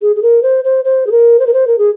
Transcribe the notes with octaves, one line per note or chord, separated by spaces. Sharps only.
G#4
G#4
A#4
C5
C5
C5
G#4
A#4
C5
A#4
C5
A#4
G#4